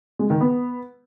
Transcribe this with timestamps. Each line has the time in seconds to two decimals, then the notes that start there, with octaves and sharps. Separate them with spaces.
0.19 G#3
0.30 D#3
0.41 B3